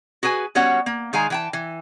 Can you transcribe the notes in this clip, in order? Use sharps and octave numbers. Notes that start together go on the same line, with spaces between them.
F#4 G#4 B4 G#5
G3 B3 C#4 F#4 C#5 F#5
A#3
D#3 G#3 F5 G#5 A#5
E3 G5 A5
E3